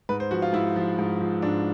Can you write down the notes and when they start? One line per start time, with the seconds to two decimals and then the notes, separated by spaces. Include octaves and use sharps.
0.09 G#2 B4
0.20 C5
0.31 F3 F#4
0.42 F4
0.53 G#2 E4
0.76 F3
0.99 G#2
1.21 F3
1.42 G#2 D4